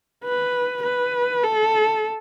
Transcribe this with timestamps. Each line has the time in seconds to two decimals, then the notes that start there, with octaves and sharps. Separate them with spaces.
0.24 B4
0.83 B4
1.43 A4